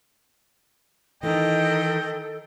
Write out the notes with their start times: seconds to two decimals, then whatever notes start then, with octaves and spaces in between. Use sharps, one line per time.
1.23 D#3 E3 D#4 A4 D#5 G5